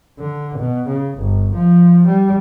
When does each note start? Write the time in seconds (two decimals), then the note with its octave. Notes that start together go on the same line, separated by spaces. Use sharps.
0.19 D3
0.59 B2
0.88 C#3
1.17 G1
1.55 F3
2.07 G3